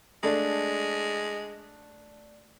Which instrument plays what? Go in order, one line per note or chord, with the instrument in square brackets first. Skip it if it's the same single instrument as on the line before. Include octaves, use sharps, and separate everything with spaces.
[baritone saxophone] G#3 [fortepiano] A3 D4